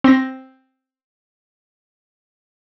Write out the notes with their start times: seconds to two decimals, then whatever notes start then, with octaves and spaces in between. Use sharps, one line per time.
0.04 C4 C6 A#6